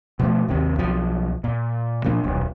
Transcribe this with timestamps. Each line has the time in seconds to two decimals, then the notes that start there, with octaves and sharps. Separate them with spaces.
0.19 B2 F3 A3
0.48 G#1 D#2 C3
0.79 B1 F3
1.44 A#2
2.04 A#2 F3 A#3 D4
2.24 D#1 B1